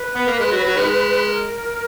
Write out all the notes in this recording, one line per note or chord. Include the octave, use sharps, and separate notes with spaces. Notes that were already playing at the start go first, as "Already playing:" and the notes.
Already playing: B4
B3
A#3
G#3
F#3
F#3
D#3 G#3
B4
A#4